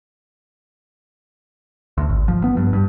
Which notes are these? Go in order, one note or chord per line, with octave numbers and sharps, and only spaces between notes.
D2
G#1
F3
B3
G2
G2